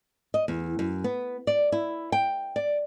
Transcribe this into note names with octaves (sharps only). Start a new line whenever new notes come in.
D#5
E2
F#2
B3
D5
E4
G5
D5